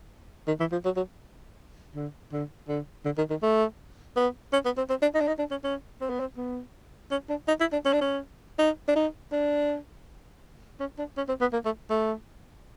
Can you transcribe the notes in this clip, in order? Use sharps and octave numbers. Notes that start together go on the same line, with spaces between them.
D#3
E3
F3
F#3
F#3
D3
D3
D3
D3
D#3
D#3
A3
B3
C#4
B3
C4
C4
D4
D#4
D4
D#4
D4
C#4
C#4
C4
B3
C4
B3
C#4
D4
D#4
E4
D4
C#4
D4
C#4
D#4
D4
D#4
D4
C#4
D4
C#4
C4
B3
A#3
A3
A3